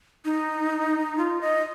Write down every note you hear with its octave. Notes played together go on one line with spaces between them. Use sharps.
D#4
F4
D#5